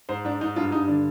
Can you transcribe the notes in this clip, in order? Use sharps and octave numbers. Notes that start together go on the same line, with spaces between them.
G#2 C5
G#2 D4
G#2 D#4
G2 F4
G2 D#4
D3 D4